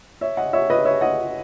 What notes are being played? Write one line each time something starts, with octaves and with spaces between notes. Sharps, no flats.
C#5 E5
D#5 F#5
C#5 E5
B4 D#5
C#5 E5
D#5 F#5